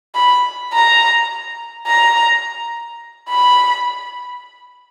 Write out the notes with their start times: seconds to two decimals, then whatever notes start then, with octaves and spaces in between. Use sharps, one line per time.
0.15 B5
0.73 A#5
1.87 A#5
3.30 B5